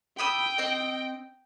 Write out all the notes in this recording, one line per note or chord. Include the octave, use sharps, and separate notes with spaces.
G5 B5 D#6 E6
C4 D#5